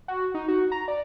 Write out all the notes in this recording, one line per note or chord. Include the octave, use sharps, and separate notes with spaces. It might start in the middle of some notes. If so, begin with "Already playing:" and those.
F#4
D#4
F#4
A#5
D5